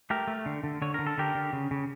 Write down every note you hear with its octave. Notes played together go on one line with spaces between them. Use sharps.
A3 G4 A#4
A3
D3
D3
D3 C#5
D3 A#4
A4
D3 G4 A#4
D3
C#3
C#3